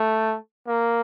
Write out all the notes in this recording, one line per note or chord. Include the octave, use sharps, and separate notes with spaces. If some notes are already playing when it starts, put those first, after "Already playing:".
Already playing: A3
A#3